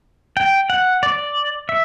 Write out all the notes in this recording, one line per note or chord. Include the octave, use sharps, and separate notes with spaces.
G5
F#5
D5
E5